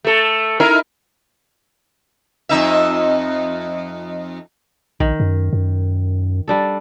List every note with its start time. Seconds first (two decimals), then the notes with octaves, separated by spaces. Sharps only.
0.05 A3 A4
0.60 D#4 E4 A#4
2.49 F2 D#4 E5
5.00 A#1 D#3
5.20 F#2
5.53 F#2
6.48 G3 D4 A4